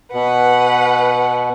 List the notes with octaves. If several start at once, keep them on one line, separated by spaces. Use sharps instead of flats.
B2 B4 F#5